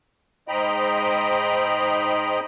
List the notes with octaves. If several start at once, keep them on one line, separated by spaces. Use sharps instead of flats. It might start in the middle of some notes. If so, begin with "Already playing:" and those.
G#2 C5 D#5 G5 A#5 B5